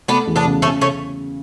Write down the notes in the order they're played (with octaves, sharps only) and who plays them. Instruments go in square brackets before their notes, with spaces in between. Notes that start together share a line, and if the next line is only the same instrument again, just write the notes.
[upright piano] A3 [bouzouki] B3 D4
[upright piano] E2
[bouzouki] B3 D4
[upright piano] C#3
[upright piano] C#3 [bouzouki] A3 C#4
[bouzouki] A3 C#4